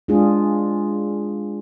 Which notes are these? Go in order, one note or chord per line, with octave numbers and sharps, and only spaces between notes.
G#3 D4 F4 G#4